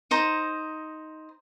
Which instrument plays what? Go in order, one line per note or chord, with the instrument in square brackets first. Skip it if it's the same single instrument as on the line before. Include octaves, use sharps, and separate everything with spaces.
[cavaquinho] D#4 C5 A#5